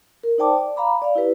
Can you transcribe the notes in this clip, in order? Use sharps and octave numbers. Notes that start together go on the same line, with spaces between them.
A#4
D#4 C5 D5 G5 A5 D6
D5
F5 A#5 B5 D6
D5 F5
E4 G4 B4